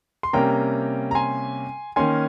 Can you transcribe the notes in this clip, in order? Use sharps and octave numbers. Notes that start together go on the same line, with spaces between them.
C6
C3 G3 A#3 C#4 G5 A#5
A#5
G#5 C6
D#3 A#3 C#4 G#5 C6